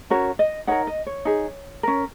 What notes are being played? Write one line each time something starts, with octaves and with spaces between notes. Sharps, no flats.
C#4 F#4 A#4 C#5
D#5
D#4 A#4 C#5 F#5
D#5
C#5
D#4 G#4
C#4 A#4